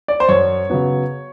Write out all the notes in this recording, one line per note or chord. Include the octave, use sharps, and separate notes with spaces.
D5
C5
F#2 C#5
C#3 F#3 B3